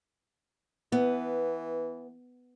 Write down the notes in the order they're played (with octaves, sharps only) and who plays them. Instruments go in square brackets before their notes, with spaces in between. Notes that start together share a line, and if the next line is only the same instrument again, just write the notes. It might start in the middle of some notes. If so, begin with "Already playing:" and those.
[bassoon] E3 [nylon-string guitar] B3